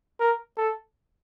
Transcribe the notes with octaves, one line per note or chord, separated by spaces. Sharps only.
A#4
A4